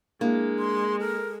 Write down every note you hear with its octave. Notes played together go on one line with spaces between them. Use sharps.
G#3 A#3 D4 E4
C6
A4 A#4